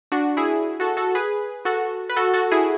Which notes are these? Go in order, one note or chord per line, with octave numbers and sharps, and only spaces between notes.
D4 F#4
E4 G#4
F#4 A4
F#4 A4
G#4 B4
F#4 A4
B4
F#4 A4
F#4 A4
E4 G#4